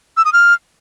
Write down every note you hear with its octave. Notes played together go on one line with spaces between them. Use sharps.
E6
D#6
F6